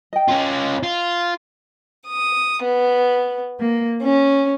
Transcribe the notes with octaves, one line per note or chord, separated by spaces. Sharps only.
D#5 G5
C#4 F4
F4
D#6
B3
A#3
C#4